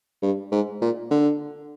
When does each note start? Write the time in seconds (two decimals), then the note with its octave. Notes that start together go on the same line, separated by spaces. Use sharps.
0.22 G2
0.52 G#2
0.81 A#2
1.10 D3